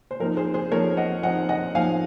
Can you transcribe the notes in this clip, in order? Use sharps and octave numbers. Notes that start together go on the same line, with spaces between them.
C5
F3 C4 D#4 A#4
G#4 C5
G#4 C5
F3 C4 D#4 A#4 C#5
D#5 F#5
F3 C4 D#4 D#5 F#5
D#5 F#5
F3 C4 D#4 F5 G#5